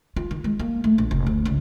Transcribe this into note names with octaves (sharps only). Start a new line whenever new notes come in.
F4
D#3
G#3
A#3
A3
A#1
F1
D2
C#2